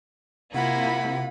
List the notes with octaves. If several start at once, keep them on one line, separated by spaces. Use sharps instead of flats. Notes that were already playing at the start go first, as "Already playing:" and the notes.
C3 A#3 E4 F4 F#5 B5